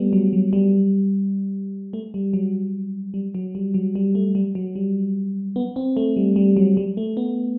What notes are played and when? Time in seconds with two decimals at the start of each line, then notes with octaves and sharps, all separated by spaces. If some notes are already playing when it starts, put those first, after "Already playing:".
Already playing: G3 A3 B3
0.13 F#3
0.33 F#3
0.53 G3
1.93 A3
2.14 G3
2.33 F#3
3.14 G3
3.35 F#3
3.55 G3
3.74 F#3
3.95 G3
4.15 A3
4.35 G3
4.55 F#3
4.76 G3
5.56 B3
5.76 C4
5.97 A3
6.16 G3
6.36 G3
6.57 F#3
6.77 G3
6.97 A3
7.17 B3